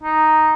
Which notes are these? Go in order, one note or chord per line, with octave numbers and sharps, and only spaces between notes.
D#4